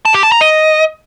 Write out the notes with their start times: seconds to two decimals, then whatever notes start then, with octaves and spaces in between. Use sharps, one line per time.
0.05 A5
0.14 G4
0.23 A5
0.32 A#5
0.41 D#5